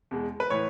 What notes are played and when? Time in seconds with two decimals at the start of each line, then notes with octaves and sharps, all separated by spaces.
0.11 E2 B2 G#3
0.40 B4
0.50 A2 E3 C#5